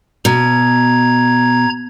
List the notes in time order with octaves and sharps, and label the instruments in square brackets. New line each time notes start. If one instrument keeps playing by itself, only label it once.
[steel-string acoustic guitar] B2 [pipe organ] A#5 G#6